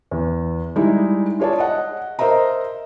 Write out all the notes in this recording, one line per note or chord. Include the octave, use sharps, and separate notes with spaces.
E2
G3 G#3 D#4 E4
F4 G#4 C#5 D5 A5
D#5 F#5
A#4 C5 D#5 E5 A#5